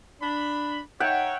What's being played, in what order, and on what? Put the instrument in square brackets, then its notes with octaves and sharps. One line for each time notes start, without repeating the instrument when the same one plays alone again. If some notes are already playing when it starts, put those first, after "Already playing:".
[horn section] D4 B5
[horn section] D#4 C#5 [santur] E5 F#5 G5